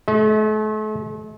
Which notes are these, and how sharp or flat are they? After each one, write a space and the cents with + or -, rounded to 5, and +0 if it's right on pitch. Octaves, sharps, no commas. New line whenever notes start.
A3 -40 D#5 +45